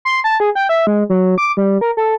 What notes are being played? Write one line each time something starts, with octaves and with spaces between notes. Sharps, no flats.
C6
A5
G#4
G5
E5
G#3
F#3
D6
G3
A#4
A4